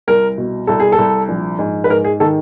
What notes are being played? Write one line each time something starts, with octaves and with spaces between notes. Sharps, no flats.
C2 A#4
B2
C2 A4
G#4
A4
C2
A#1
G#2
B4
G#2 A#4
G#4
D#3 A4